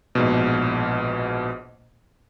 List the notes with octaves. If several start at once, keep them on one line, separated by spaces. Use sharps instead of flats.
A#1 G#2 B2